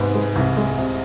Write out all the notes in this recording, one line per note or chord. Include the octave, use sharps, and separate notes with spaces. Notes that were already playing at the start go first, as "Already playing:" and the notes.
Already playing: G#2 C3 B3
G#3
C2
G#3
C3